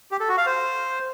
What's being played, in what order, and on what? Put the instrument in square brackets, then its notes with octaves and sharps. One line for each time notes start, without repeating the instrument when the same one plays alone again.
[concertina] G4
A4
F#4
F5
C5